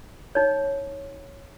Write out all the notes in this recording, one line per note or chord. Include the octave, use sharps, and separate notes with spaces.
D#4 C#5